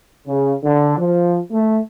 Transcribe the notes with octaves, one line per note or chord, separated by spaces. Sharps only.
C#3
D3
F3
A3